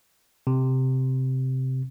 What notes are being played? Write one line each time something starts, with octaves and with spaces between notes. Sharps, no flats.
C3